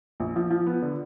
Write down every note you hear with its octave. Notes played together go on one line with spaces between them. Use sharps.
A#1
F3
F3
B3
D3